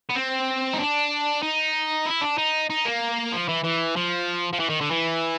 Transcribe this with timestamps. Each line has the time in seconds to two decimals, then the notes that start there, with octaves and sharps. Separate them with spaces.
0.10 B3
0.16 C4
0.74 D#4
0.79 D4
1.43 D#4
2.06 E4
2.22 D4
2.38 D#4
2.70 D#4
2.85 A#3
3.33 F3
3.49 E3
3.64 E3
3.96 F3
4.53 F3
4.60 E3
4.70 D#3
4.81 D3
4.91 E3